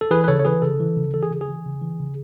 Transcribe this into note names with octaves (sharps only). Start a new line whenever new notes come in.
A4
E3 G#4 B4
B4
C#3 A4 C#5
C#5
E3 G#4 B4
C#3 A4
E3
C#3
E3 A4
G#4
C#3
G#4
E3
C#3
E3
C#3